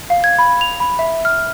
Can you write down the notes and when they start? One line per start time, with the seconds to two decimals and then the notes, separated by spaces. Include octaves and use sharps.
0.10 F5
0.24 G#6
0.39 B5
0.61 F7
0.80 B5
0.99 E5
1.25 F6